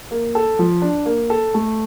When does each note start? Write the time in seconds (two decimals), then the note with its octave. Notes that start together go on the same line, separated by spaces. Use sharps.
0.11 A#3
0.35 A4
0.59 F3
0.82 D4
1.06 A#3
1.30 A4
1.54 A3